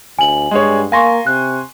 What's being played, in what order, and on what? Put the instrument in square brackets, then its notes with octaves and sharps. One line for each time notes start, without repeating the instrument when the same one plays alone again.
[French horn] D2 [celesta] G#5 F#7
[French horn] G2 [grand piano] G#3 G#4 C#5
[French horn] A#3 [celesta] F5 A#6 [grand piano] G#5 C6 C#6
[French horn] C3 [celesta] F#6